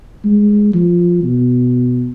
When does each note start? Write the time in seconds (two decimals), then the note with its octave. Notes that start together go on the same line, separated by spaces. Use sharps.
0.25 G#3
0.74 F3
1.24 B2